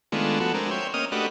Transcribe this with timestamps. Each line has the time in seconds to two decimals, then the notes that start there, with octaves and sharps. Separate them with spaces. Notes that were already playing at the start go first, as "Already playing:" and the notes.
0.12 D#3 G#3 A3 B3 D4 F4
0.40 F3 B3 F#4 A4
0.54 G#3 C4 D4 A#4
0.71 C5 C#5 E5 G5
0.94 A#3 C#4 D#5 D#6 F6
1.12 A3 D4 F#4 G4 B4 D#5